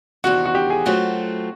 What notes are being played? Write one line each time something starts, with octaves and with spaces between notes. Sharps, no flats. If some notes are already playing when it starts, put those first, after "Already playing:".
E2 C3 D#3 F#4
F#4
G4
G#4
F#3 A3 C4 F4 F#4